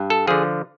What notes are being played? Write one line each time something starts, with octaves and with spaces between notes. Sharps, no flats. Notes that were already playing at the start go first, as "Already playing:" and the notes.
Already playing: G2
A4
D3 F3 G#4